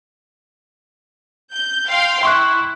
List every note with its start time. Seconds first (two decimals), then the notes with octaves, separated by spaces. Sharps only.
1.52 G6
1.89 F5 G5 C6
2.23 E4 C6 C#6 F#6